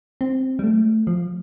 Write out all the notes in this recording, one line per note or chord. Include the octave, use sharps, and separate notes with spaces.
C4
G3
A3
F3